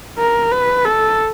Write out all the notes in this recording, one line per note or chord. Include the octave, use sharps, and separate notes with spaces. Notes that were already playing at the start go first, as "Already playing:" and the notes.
A#4
B4
A4